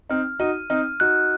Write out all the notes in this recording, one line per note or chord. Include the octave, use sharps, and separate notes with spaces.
C4 D#4 F6
D#4 F#4 D#7
C4 D#4 F6
D#4 F#4 F#6